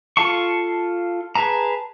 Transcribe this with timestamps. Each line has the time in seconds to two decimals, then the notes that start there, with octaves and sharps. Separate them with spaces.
0.17 F4 A4 F5 A5 C#6
1.35 G#4 B4 A5 A#5